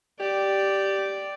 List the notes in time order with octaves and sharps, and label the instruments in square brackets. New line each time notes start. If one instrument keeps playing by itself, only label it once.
[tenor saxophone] G4 [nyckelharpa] D5